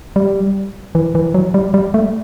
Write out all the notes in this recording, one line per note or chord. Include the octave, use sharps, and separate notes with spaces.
G3
E3
E3
F#3
G3
G3
A3